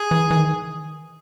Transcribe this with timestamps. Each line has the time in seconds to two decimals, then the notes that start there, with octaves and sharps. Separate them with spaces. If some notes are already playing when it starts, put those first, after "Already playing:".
Already playing: G#4
0.11 E3
0.31 E3
0.36 D#3